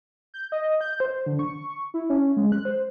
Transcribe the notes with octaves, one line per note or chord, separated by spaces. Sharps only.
G6
D#5
G6
C5
D3
C#6
E4
C#4
G#3
F#6
C5